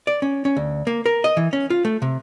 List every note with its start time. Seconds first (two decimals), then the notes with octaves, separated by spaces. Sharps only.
0.07 D5
0.22 C#4
0.45 C#4
0.57 D2
0.87 A#3
1.06 A#4
1.24 D#5
1.37 E3
1.53 C#4
1.70 F4
1.85 A3
2.02 C3